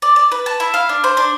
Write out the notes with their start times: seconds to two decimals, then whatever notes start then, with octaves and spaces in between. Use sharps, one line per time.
0.02 D5
0.16 D5
0.32 B4
0.46 A5
0.60 E4
0.74 F5
0.89 D4
1.04 C5
1.17 D4